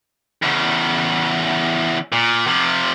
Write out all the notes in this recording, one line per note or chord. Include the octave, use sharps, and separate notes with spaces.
E2 C#3
A#2
C3 F3